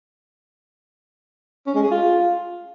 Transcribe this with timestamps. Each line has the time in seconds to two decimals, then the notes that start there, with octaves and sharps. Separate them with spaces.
1.66 C#4
1.75 G#3
1.83 G#4
1.91 F4